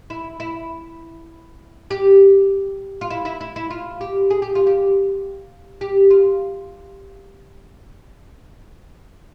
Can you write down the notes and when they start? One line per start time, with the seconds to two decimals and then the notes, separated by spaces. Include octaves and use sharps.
0.10 E4
0.40 E4
1.91 G4
3.01 F4
3.10 E4
3.25 E4
3.41 E4
3.56 E4
3.70 F4
4.01 G4
4.30 G#4
4.42 G4
4.55 F4
4.67 G4
5.81 G4
6.10 F4